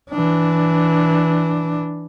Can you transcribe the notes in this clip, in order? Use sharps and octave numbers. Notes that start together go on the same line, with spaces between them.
E3 D4